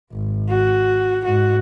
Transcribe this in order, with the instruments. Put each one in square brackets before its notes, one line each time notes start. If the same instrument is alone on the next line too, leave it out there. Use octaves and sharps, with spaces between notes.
[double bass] G#1
[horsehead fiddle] F#4
[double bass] G#2 [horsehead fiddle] F#4